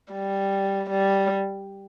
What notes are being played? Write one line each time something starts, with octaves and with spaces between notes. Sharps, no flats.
G3
G3